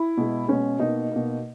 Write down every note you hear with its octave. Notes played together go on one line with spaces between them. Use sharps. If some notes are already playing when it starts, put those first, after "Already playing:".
Already playing: E4
B2 G#3
B2 G#3 C#4
B2 A#3 D#4
B2 A#3